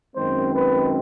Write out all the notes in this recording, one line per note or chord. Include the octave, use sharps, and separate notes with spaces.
F#2 D#3 G#3 C4 C5
B4